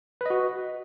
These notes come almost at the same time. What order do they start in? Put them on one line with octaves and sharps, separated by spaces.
B4 D#5 F#4